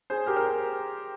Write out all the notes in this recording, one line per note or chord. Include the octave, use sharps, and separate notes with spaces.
G#4 C5
G4 A#4
A#4
G#4